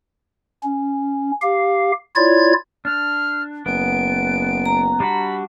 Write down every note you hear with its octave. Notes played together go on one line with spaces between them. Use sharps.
C#4
G4 F5
E4 F4 C#5 D5 G#6
D4 F6
F#1 B3 D7
A#5
G3 D4 F#4 B5